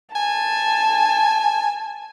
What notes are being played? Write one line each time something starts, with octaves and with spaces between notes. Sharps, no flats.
G#5 A5